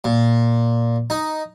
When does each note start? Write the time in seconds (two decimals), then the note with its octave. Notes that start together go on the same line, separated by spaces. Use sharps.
0.04 A#2
1.10 D#4